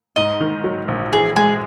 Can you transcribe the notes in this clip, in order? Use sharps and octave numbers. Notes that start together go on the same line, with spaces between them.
G#2 D#5
D#3
F#3
A#1
E3 G#4
G#3 G#4